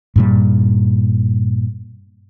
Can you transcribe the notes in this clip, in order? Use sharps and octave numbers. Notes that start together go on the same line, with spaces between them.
G2 A#2 G3